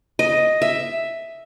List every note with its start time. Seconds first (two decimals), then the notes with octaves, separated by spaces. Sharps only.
0.19 D#5
0.62 E5